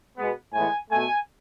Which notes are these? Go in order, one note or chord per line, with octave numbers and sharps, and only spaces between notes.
B2 G#3 B3
A2 E3 G#3 B3 G#5
B2 A3 G#5